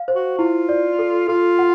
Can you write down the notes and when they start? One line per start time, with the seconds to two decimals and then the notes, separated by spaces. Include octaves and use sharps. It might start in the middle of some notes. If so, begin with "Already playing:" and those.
Already playing: F5
0.08 C5
0.15 F#4
0.38 E4 F4
0.69 D5
0.99 A4
1.28 F4 A4
1.59 F#5